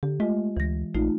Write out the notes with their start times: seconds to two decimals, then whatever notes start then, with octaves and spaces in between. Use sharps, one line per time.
0.03 D3 G4
0.20 G#3 A3 F4 D#5
0.57 D2 E3 A#6
0.95 A#1 A3 D#4 F4